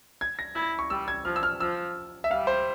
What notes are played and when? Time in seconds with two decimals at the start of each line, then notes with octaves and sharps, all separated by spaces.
0.21 G#6
0.39 A#6
0.55 E4 G#6
0.79 C#6
0.90 G3 E6
1.08 G#6
1.25 F3 F6
1.36 E6
1.43 F6
1.60 F3 E6
2.24 E5
2.30 G3 F5
2.47 C5